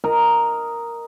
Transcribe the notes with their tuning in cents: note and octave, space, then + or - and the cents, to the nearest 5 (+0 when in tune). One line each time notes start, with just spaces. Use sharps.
A#4 +0 D#5 +0